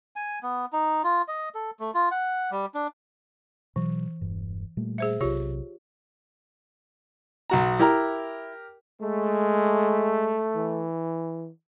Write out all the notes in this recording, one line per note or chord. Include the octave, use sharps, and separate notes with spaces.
G#5
B3
D#4
F4
D#5
A4
A3
F4
F#5
G3
D4
B2 E3 F#3
E1 G2
A#2 G3 A3
G#4 C5 E5
B1 C3 F4 G4 C#5
B1 F#4 A#5
E4 G4 A#4 A#5
G#3 A3
E3